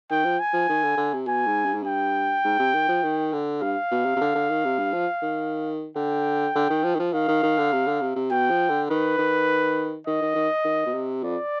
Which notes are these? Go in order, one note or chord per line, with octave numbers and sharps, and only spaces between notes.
D#3 G5
F3
G#5
F3
D#3
D3
D3
C3
B2 G#5
G#2
G2
G#2
G2 G5
G#2
C3
D#3
F3
D#3
D3
G2 F5
B2
C3
C3
D3
D3
D#3
C3
G2
F3
D#3
D3 G5
D3
D#3
F3
D#3
F3
D#3 F5
D#3
D#3
D3
C3
D3
C3
C3
B2 G5
F3
D3
D#3 B4
D#3
D#3 D#5
D#3
D#3
D#3
B2
C3
F2 D5